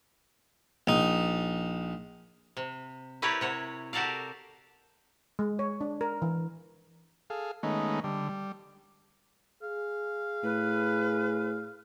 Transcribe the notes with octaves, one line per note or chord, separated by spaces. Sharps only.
A#1 D#4
C3
E4 G4 A#4 B4 C#5 D5
C3 C#5 F#5
F#4 G4 A4 A#4 D5 F5
G#3
C#5
D4
A#4
E3
G#4 A4 F5
D#3 G#3 A3 B3 C#4 D#4
D3 G3
G3
G#4 F5
A2 B4